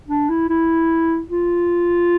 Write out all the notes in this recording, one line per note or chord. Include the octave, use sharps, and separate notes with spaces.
D4
E4
E4
F4